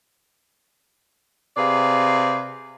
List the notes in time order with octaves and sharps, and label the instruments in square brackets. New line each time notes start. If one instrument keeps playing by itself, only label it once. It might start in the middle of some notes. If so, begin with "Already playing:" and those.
[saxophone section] C3 G#4 B4 D5 F5